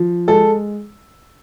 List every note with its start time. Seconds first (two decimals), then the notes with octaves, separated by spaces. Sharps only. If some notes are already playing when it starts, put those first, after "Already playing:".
Already playing: F3
0.28 G#3 A4